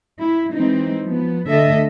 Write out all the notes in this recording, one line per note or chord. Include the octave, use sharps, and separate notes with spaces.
E4
E3 G#3 C4 D#4
F3 B3
D2 D3 A3 A4 D#5 E5